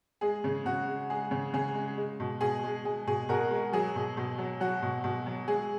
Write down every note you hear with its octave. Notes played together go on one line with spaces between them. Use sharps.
G#3 G#4
C#3
C#3 F#4
G#3
G#3 G#4
C#3
C#3 G#4
G#3
G#3
B2
B2 G#4
G#3
G#3 G#4
B2 G#4
B2 F#4 A#4
G#3
F#3 G#4
B2
B2
F#3
F#3 F#4
B2
B2
F#3
G#3 G#4